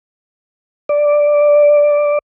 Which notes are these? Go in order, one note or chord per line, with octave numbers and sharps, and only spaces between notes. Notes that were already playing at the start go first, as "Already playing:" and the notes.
D5